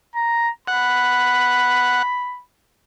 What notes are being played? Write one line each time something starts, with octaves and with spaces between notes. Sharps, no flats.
A#5
F#5 B5